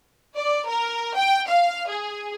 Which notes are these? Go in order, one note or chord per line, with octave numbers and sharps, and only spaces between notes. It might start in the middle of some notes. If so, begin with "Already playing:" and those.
D5
A#4
G5
F5
G#4